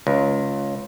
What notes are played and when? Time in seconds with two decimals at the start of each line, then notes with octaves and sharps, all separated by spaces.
0.07 C#2